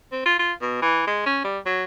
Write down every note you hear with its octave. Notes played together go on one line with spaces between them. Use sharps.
C4
F4
F4
B2
E3
G#3
C#4
G3
F#3